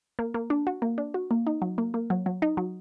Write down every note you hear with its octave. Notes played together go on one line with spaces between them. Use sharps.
A#3
A#3
D4
F#4
A#3
D4
F#4
A#3
D#4
F#3
A#3
A#3
F#3
F#3
D#4
F#3